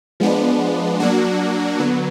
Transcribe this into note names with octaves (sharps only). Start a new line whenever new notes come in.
F3 G#3 B3 D4
F#3 A#3 D4 F#4
D3 F#3 B3